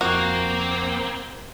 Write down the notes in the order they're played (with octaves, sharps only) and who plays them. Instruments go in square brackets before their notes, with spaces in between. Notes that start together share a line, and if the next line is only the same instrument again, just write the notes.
[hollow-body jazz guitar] F2 A#4 [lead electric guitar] A#3 [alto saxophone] C4 [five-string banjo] F#4